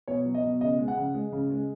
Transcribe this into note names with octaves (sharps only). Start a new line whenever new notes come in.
B2 C#5
F#3
D#5
B2
C#3 D#5
G#3
F#5
C#3
G#3
C#3
G#3